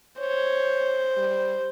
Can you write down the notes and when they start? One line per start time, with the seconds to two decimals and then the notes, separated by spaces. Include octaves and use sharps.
0.19 C5 C#5
1.17 G3